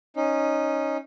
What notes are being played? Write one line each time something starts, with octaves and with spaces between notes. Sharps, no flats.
C#4 D#4